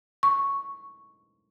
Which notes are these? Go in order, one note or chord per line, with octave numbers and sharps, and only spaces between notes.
C#6